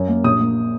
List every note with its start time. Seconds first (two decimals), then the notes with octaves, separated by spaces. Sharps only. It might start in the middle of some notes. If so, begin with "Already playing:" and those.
Already playing: F#2
0.08 A#3
0.24 A#1 D#6
0.41 A#3